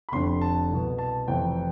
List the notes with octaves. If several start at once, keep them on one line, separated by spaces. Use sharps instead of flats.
B5
F1 F2 D3 C6
A5
C2 B2
A5
F1 F2 C3 E3 G5